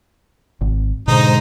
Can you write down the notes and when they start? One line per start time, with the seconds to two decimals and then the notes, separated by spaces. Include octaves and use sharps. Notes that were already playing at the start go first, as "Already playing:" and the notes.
0.61 G#1
1.08 G#2 B2 D3 D#4 C5 A#5